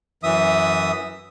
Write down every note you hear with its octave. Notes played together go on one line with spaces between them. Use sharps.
F#2 E3 E5 D#6